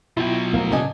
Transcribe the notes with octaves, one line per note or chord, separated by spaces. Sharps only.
B2 F#3 E4 F4 G5
D#2 A2 F3 A#3
A2 C#3 D4 D#5 G#5